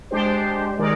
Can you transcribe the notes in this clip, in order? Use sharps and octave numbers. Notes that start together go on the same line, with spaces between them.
G#3 D4 G4 C5
D#3 G#3 D#4 A#4 D5